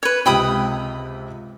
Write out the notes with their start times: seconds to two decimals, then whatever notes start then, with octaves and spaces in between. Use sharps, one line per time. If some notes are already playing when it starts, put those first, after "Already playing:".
0.03 B4 C#5
0.26 C#2 C3 G5 B5 D#6